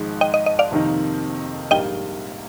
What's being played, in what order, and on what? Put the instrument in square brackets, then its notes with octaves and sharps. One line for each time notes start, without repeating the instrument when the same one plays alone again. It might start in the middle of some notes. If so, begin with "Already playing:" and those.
Already playing: [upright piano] G#1 G#2 F3 G#3 D#4
[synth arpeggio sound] D#5 G5
D#5
D#5
D5 F5
[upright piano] F2 C3 D#3 A#3 D#4
[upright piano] A#1 G#2 G3 A#3 [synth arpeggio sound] D#5 G5